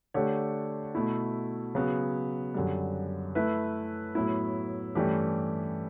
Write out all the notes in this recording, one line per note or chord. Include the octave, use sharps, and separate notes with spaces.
D3 A3 D4 G4 C#5
B2 A3 E4
C#3 F#3 B3
F#2 D3 G3
A3 E4 B4 E5
A2 F#3 B3 E4
G2 E3 A3 C#4 G4